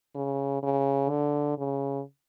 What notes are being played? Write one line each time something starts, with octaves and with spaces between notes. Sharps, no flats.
C#3
C#3
D3
C#3